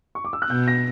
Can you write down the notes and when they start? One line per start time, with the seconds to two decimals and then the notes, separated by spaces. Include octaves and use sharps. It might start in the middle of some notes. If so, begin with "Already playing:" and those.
0.15 C#6
0.25 D6
0.33 E6
0.42 F#6
0.49 B2 G6
0.68 A#6